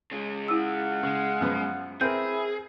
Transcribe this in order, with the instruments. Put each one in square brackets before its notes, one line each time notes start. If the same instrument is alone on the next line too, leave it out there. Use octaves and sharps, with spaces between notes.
[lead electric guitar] C#3 G#3
[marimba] E4 E6 [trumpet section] F5 F#5
[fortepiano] C#3 [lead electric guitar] G#3
[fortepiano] F#2 F3 B3
[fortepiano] C4 A#4 [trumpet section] E4 B4 E5 [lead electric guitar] G#4 [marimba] G6